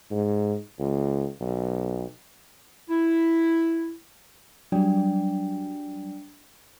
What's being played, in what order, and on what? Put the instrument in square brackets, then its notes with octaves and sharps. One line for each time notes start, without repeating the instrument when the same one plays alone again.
[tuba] G#2
C#2
B1
[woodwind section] E4
[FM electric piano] F#3 G3 [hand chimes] D4 D5 G5